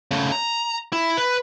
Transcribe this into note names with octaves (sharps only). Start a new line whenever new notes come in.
C#3 A3
A#5
E4
B4